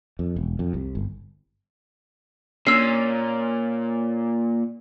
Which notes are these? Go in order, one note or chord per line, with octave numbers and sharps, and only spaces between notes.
F2
E1
F2
C2
G1
A#2 C#4 E6 C7